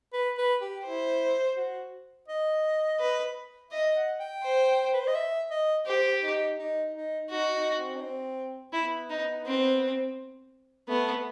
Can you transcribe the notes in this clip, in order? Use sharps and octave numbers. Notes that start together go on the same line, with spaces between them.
B4
B4
G4
E4 C5
F#4
D#5
B4
D#5 E5
F#5
G5
C5
B4
C5
D#5
E5
D#5
G4 C5
D#4
D#4
D#4
D#4 F#4
D#4
C4
D#4
C4
B3 E4
D#4
C4
A3 B3